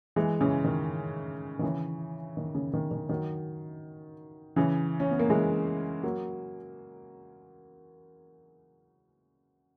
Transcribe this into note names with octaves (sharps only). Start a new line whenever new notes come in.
E3 G#3
C#3 E3
D#3
D#3
C#3 E3
D#3
C#3
D#3
D#3
D#3 F#3
C#3 E3
C#4
B3
A#3
E3 G#3
F#3 A#3